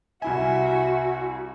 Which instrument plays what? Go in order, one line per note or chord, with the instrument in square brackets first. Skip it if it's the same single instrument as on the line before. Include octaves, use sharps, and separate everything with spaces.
[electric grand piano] C2 E4 G#5 [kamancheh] F#4 [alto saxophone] E5